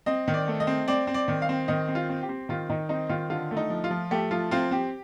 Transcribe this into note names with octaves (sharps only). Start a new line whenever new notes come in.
C4 D#5
D#3
D5
A3
D#5
C4
C4 D5
C4
D5
D#3
F5
C4
D#3 D#5
C4
F4
C4
G4
C4
D#3 F4
D#3 D#4
C4 D#4
D#3 F4
D3 F4
A3
D#4
F3
F4
F3
A3 G4
F3 F4
C4 F4
C4 G4